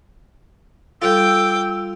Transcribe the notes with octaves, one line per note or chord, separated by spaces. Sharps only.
G3 F4 A4 G5 D6 E6